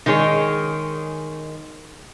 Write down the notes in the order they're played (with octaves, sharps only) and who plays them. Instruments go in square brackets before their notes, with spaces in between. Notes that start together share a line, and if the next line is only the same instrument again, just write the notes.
[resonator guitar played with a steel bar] D#3 G#3 G#4 C#5